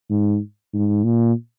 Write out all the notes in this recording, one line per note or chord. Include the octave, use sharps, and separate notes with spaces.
G#2
G#2
A#2